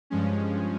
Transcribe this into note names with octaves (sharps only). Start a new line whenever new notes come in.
G2 F3 G#3 C#4